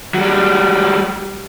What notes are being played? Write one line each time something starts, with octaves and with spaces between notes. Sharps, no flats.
F#3 G3